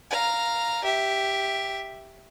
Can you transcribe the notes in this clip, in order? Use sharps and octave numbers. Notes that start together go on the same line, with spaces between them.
F5 A#5
G4 E5